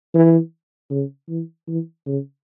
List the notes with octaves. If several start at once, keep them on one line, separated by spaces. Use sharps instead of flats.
E3
C#3
E3
E3
C#3